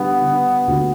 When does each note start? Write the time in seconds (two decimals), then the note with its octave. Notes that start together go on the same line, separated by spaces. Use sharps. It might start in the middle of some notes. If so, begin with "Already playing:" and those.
Already playing: D3 G3 B3
0.20 D3
0.68 D2